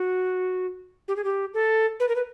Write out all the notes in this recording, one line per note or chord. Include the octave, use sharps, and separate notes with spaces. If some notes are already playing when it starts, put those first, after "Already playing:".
Already playing: F#4
G4
G#4
G4
A4
B4
A#4
B4